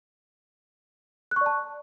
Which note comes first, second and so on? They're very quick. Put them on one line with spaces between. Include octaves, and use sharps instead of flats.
F#6 C#6 D5 A5